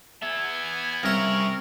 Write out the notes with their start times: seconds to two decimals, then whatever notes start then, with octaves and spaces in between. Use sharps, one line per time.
0.22 B3 E5 G#5
1.03 C2 C#3 A#4 C#5 E5